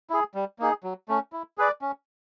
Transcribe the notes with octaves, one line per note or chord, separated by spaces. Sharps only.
E4 G#4
G3
A#3 D#4 G#4
F#3
A3 C#4
E4
G#4 B4 D5
C#4